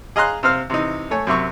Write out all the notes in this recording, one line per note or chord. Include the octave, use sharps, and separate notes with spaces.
G#4 D#5 F5 A#5 C6 F#6
C3 C4 F5 F6
C3 E3 D#4
A3 C#5 G#5
F#2 C3 E5 C#6